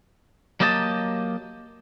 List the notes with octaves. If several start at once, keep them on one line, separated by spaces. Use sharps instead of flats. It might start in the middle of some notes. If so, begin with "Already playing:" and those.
F#3 A#3 G4 D#5 A5